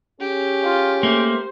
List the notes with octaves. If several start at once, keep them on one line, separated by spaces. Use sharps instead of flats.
C#4 G4 G#4
F4
A3 A#3 C5